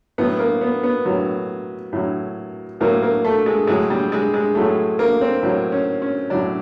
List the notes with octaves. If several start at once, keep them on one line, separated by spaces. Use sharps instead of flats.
A2 F#3 B3
A#3
B3
B3
A2 F#3
A2 F#3
A2 F#3 A#3
A#3
A3
G#3
A2 F#3 G#3
G3
G#3
G#3
A2 F#3 A3
A#3
C4
A2 F#3
C#4
C#4
A2 F#3 D4